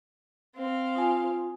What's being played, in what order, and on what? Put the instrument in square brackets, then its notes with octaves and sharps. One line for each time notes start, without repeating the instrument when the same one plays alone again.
[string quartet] C4 F5
[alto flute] F4 [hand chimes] G#5 D#6